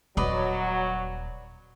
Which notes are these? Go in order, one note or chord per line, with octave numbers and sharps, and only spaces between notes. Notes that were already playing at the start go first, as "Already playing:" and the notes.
D#1 F#3 B4 D5 D#5